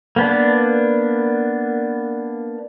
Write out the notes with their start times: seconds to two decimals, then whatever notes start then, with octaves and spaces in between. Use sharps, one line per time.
0.16 A#3 B3 D4